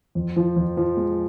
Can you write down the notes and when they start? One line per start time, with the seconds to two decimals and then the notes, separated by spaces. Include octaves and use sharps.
0.15 F2
0.36 F3
0.56 F2
0.77 F3
0.97 G#3